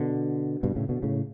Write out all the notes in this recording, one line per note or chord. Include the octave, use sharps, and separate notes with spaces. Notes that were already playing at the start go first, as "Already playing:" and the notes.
Already playing: B2 D3
G2 B2
A2 C#3
B2 D3
A2 C#3